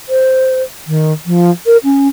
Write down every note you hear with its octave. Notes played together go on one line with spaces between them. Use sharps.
C5
D#3
F3
A#4
C#4